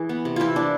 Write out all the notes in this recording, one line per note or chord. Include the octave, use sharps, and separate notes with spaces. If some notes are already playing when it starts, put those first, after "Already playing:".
Already playing: E3 G#4
B3
C3
E3 E4 F4
E3 D4